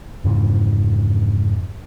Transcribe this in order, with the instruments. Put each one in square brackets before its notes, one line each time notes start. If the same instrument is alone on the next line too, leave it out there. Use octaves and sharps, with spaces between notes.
[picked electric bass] F2 G#2 C#3 E3